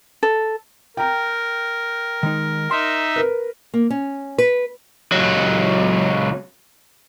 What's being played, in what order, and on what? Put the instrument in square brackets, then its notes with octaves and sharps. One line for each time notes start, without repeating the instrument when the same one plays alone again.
[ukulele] A4
[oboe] A#4 [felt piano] G5 A#5
[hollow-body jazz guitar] D#3 G#3 D#4
[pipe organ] D#4 E5 [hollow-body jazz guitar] C6
[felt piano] A#4 B4
[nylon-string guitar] A#3
C#4
B4
[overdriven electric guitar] C#2 F#3